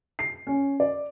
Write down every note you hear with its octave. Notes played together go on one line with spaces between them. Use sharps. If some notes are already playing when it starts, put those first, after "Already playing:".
C7
C#4
D5